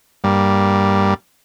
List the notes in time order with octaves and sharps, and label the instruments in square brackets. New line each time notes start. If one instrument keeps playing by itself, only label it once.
[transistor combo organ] G2 G3 A#3